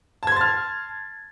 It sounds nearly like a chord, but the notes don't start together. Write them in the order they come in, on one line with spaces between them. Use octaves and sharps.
A5 G#6 C6 A6 F6